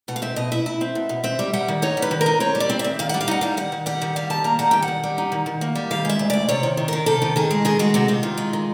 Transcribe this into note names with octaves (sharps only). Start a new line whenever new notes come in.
B2 F#5
F5
C4 E5
B2 D#5
E4 E5
E4
C4
B2
B2
C4 E5
G3
G3 F#5
D#3
D#4 C#5
G3
B4
D#3
A#4
D#4
C4 C#5
G3
D5
C4
E5
D#3
D#3 F5
G3 F#5
F5
D#4 F#5
G3 F5
D#3 F#5
D#3
G3 F#5
D#3
G3 F5
D#3 A5
A#3 A#5
G3 F#5
D#3 G5
F#5
D#3
G3
D#4
D#3
D#3
A#3
G3
D#3 F5
G#3 E5
D2
D2 D5
C3 C#5
D#3
D#3
D#3 A#4
C3 A4
D#3
D#3 G#4
G#3
D#3 G#4
G#3 F#4
C3 F#4
C3 F4
D#3
G#3
D#3